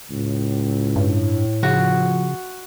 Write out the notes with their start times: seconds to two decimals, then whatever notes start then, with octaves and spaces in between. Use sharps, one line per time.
0.10 C#2 A2
0.96 G2
1.63 C#3 F3 F#4